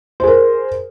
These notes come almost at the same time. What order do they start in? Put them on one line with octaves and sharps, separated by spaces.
C5 G#4 A#4